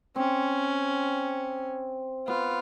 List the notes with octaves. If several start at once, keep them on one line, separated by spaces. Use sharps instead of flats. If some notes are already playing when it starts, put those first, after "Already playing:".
C4 C#4
B3 F4